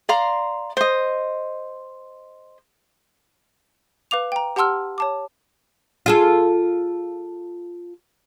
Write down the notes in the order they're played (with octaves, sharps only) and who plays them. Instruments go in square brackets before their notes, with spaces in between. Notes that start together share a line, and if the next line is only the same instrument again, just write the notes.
[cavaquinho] D5 F5 A#5 C6
C5 D#5
[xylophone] B4 F5 D6 F7
G5 A#5
G4 F#5 A5 C6 E6 F6
C#5 A5 D6
[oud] F4 G#4 A4